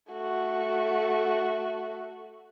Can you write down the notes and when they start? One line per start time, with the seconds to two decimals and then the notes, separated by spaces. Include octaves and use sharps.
0.12 A3 F#4